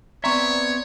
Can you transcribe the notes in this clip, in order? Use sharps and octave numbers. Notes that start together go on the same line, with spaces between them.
B3 C4 C#5 D5 E5 A#5 C6 C#6